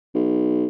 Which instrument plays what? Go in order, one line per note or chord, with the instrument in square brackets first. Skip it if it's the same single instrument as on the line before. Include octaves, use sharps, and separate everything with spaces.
[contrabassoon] B1